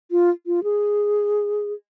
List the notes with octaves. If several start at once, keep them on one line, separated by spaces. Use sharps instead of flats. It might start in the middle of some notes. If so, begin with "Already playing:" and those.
F4
F4
G#4